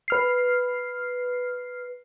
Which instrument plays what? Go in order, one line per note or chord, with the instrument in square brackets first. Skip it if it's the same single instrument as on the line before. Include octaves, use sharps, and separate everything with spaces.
[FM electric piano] B4 F6 C7